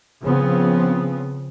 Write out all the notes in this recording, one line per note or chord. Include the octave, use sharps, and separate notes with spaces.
C#3 F3 B3 C4